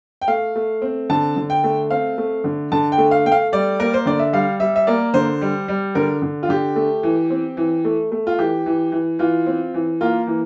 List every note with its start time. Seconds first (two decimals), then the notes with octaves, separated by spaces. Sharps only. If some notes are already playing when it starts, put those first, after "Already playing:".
0.21 G5
0.28 A3 F5
0.55 A3
0.82 C4
1.10 D3 A5
1.36 D3
1.50 G5
1.64 A3
1.90 C4 F5
2.18 A3
2.44 D3
2.72 D3 A5
2.92 G5
2.98 A3
3.11 F5
3.26 A3 G5
3.32 F5
3.52 G3 D5
3.79 A#3 A#4
3.94 C5
4.06 D3 D5
4.19 E5
4.33 G3 F5
4.60 G3 E5
4.76 E5
4.87 A#3 D5
5.14 D3 C5
5.41 G3
5.68 G3
5.95 D3 A#4
6.22 D3
6.43 F4
6.49 D3 G4
6.76 A3
7.03 E3
7.30 C4
7.57 E3
7.85 A3
8.12 A3
8.27 F4
8.38 E3 G4
8.66 E3
8.92 E3
9.19 E3 F4
9.46 C4
9.74 E3
10.01 A#3 F4
10.27 E3